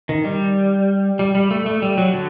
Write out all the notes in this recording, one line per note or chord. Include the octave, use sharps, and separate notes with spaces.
D#3
G3
G3
G3
A3
A3
G3
F#3
D3